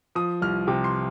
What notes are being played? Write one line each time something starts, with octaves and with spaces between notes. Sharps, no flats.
F3 D#6
C2 F6
C3 G5
C6